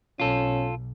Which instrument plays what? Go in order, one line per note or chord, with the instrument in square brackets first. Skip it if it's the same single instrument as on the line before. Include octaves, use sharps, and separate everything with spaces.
[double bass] B1 [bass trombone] C#4 [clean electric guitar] F4 A4